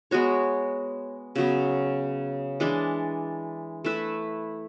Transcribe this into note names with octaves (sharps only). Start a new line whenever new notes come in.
G#3 B3 F#4 C#5
C#3 F#3 B3
E3 G#3 D4
A3 E4 B4 E5